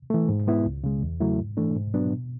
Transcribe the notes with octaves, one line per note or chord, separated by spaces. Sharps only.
E3 A3
G#2
G#3 B3 E4
C#2
C#3 G#3
E2
C#3 F#3 A3 E4
G#2
E3 A3 D4
G#2
F#3 B3 D4
B2